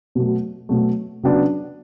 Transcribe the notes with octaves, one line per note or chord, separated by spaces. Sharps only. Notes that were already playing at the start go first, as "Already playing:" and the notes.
B2 F#3 A3
B2 F#3 A3
C#3 F#3 B3 D4